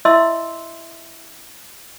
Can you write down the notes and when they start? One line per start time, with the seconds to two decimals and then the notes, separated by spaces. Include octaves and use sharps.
0.05 E4 D#5 E5 C6 E6